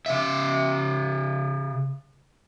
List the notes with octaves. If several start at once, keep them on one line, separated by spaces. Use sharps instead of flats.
C#3 E5